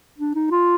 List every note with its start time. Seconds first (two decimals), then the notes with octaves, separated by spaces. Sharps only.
0.19 D4
0.35 D#4
0.51 F4